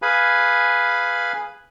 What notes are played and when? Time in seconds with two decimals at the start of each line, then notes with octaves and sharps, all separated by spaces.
0.02 G#4 B4 F5 G#5 B5